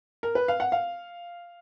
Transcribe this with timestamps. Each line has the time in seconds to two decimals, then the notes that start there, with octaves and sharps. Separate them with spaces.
0.23 A#4
0.35 B4
0.48 F5
0.60 F#5
0.72 F5